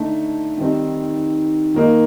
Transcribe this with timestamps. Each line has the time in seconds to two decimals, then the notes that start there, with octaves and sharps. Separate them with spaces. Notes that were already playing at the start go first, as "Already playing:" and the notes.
Already playing: D3 A3 D#4
0.58 D#3 G3 C4 D#4
1.74 D#3 A#3 D#4